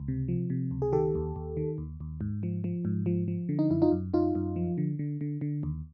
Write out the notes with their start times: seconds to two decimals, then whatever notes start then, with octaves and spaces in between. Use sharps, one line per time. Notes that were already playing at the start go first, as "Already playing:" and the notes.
Already playing: C#2
0.08 C3
0.28 F3
0.50 C3
0.71 C#2
0.82 G#4
0.92 D#3 G4 A4
1.15 D#2
1.36 D#2
1.57 D#3
1.78 D#2
2.00 D#2
2.21 G#2
2.43 F3
2.64 F3
2.85 G#2
3.06 F3
3.28 F3
3.49 D3
3.59 D#4
3.70 F#2 E4
3.82 D#4 F4
3.92 F#2
4.14 F#2 D#4 F4
4.35 F#2
4.56 F3
4.78 D3
4.99 D3
5.21 D3
5.41 D3
5.63 D#2